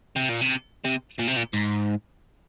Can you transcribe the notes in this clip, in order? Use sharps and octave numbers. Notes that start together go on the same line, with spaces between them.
C3
A#2
C3
C3
A#2
C3
A#2
G#2